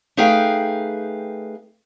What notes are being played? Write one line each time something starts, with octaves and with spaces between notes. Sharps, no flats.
A3 D#4 G#4 B4 F5 G5